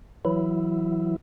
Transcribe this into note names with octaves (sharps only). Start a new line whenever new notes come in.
E3 F#3 E4